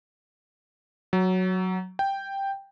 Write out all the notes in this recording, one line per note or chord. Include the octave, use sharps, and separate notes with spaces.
F#3
G5